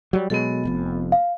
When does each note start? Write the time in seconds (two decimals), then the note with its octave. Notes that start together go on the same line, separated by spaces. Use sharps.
0.13 F#3 G3
0.30 B2 F#3 G#3 B3 A4
0.65 F1 F2
1.12 F5